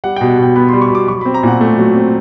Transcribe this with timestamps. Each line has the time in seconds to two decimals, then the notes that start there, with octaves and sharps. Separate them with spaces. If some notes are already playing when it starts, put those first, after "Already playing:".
0.04 G3 F#5
0.16 G5
0.21 B2
0.30 F#5
0.38 B2 G5
0.56 B3 B5
0.69 C6
0.73 G3
0.82 C#6
0.91 B2 D6
1.08 F#3 C#6
1.21 B5
1.26 C4
1.34 A#5
1.43 A#2 F#5
1.61 A3
1.78 F#3
1.95 C4